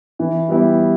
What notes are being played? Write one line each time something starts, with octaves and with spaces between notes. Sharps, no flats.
E3
G3 B3 E4 G4